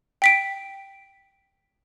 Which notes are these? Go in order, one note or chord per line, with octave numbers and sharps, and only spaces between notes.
G5 B6 D7